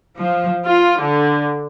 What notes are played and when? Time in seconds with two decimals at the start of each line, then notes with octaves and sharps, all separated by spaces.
0.18 F3
0.65 F4
1.00 D3